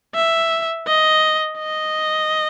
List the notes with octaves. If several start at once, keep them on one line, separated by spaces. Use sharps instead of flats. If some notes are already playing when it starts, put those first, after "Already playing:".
E5
D#5
D#5